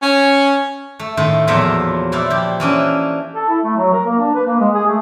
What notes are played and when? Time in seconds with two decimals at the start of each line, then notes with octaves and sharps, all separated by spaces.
0.02 C#4
0.99 A3
1.17 A2 D#3 A3 F4
1.47 E2 A#2 F3 F#3 E5 F5
2.12 A#2 E4 D5 F5
2.30 F3 G4
2.60 E3 A#3 C#4 D4
3.34 A4
3.49 E4
3.64 A3
3.77 F#3
3.93 A#4
4.05 A#3
4.19 D4
4.35 B4
4.46 A#3
4.60 G#3
4.74 G#4
4.87 A3